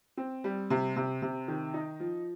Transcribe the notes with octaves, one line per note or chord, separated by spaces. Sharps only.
C4
G3
C3
C3
C3
D#3
D#4
F3